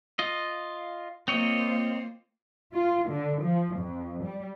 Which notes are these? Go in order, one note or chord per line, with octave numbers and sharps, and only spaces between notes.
F4 D#5
A#3 C4 F4 C5 C#5 D#5
F4
D3
F3
F2
G3